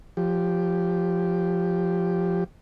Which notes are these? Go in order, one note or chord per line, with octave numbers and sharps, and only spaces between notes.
F3 G4